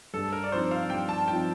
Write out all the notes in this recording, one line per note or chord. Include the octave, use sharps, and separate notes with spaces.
G2 A4
A#4
D5
F3 C4 D#4 C5
F5
G2 G5
A5
F3 C4 D#4 G5